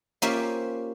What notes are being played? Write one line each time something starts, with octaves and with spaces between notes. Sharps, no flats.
A#3 C#4 F4 G4 C5 E5